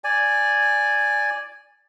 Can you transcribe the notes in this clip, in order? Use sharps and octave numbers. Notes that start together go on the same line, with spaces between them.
D5 G#5